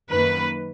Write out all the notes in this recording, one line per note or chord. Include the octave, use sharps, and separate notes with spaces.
F#2 D#3 A#3 B4